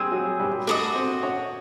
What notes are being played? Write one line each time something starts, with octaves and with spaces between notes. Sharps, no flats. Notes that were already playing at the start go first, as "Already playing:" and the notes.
Already playing: G3 C4 G4 G#4
F#3 F#4
G3 G4
A3 D4 F#4 A4 A#4 D#5
C4 C5
C#4 C#5